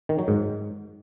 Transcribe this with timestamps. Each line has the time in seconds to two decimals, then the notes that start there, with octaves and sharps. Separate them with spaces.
0.09 D#3
0.19 F#3
0.28 G#2